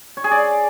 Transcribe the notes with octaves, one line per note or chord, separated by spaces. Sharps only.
C#5
G#4
D5